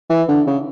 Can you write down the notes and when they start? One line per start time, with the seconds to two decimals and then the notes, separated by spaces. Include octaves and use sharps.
0.09 E3
0.28 D3
0.47 C#3